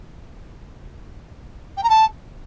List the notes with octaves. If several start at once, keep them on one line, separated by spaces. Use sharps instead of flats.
G5
A#5
A5